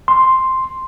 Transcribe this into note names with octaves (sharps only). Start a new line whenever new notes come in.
C6